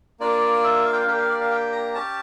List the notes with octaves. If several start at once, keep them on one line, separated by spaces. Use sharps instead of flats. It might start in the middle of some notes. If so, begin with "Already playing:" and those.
A#3 D4 F4 D5
E5
F5
G5
F5
A#3 D4 G4 G5
F5
D5
F5
G5
A#5
C#4 G4 A5